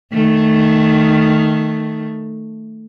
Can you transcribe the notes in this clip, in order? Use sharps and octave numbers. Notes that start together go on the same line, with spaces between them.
D#3 A3